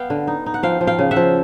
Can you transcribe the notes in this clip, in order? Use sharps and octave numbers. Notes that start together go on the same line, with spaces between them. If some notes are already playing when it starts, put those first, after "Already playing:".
Already playing: B3 F5 G5
D3
D#4
D#4
F#5
F3 F5 G5
F3
F5 G5
C#3
E5 F#5
F3